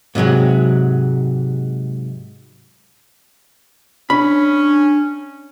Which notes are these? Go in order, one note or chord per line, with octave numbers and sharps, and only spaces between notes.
G#2 C3 F#3 G#3
C#4 D4 B5